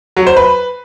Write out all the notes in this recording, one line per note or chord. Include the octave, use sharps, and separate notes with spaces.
F#3
C5
B4